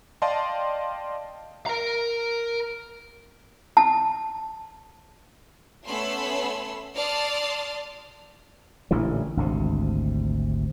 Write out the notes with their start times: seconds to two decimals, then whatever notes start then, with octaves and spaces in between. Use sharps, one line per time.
0.22 D5 D#5 F5 G5 A5 C6
1.66 A#4 A#5
3.77 A5
5.87 A3 B3 C#4 B5 C6 E6
6.94 D5 A5 C6 D#6 F6
8.91 A1 A#2 D3 E3
9.37 G#1 D2 C3